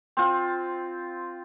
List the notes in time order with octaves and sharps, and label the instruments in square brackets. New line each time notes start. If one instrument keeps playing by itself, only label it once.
[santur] C4 F4